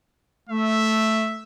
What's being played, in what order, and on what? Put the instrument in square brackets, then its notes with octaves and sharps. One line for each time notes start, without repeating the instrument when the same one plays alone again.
[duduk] A3 [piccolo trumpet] E5